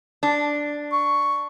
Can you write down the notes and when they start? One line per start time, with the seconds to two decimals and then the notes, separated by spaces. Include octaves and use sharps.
0.23 D4
0.92 C#6